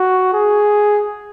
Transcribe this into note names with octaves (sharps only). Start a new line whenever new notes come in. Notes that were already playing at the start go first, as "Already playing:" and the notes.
Already playing: F#4
G#4